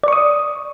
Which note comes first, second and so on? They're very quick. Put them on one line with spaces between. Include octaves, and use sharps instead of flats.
D5 C#6 D#6